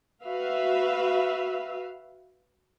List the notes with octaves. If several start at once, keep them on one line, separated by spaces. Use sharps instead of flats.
F#4 B4 E5 F5